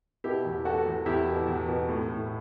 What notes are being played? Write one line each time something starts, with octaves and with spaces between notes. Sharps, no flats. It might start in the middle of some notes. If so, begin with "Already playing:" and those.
B2 E4 G4
E2
B2 F#4 A4
E2
E2 E4 G4
B2
E2
B2
A2
A2